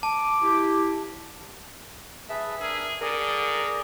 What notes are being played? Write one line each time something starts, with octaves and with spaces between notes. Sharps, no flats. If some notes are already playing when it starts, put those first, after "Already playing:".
A5 D6
E4 G4
G#4 B4 E5 A5
D4 G#4 A#4 E6
D3 G#4 A#4 D5